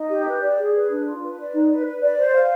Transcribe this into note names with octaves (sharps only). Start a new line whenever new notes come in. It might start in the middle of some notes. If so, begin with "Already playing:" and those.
Already playing: D#4
G4
B4
D5
G#4
B4
D4
F4
B4
D5
D#4
B4
B4
D5
C5
F5